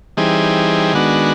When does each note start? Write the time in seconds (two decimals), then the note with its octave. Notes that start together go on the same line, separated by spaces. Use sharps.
0.17 E3 G3 C4 D#4 G#4
0.94 D#3 G#3 B3 D4 F#4